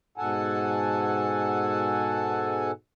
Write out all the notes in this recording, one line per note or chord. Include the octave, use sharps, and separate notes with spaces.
G#2 B2 A4 F#5 G#5 A5